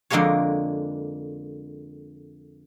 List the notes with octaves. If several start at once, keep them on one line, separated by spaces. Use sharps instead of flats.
F2 D3 G#3 A#3 G#4 C#5